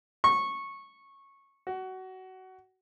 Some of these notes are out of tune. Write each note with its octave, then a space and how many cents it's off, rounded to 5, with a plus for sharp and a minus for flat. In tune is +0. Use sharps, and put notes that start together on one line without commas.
C#6 -15
F#4 +20